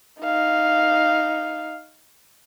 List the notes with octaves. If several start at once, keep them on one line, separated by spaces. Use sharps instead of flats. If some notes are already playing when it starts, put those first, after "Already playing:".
D#4 F5